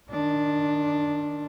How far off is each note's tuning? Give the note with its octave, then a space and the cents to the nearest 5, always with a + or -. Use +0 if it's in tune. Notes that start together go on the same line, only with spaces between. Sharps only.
D#3 -25 D4 +0